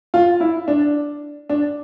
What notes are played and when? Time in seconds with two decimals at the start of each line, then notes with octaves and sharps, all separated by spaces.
0.14 F4
0.40 E4
0.68 D4
1.50 D4